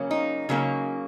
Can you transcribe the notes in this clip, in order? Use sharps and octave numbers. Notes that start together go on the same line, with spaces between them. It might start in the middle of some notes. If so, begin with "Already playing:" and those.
Already playing: C#3 F#3 A#3 C#4
D#4
C#3 F#3 A#3 C#4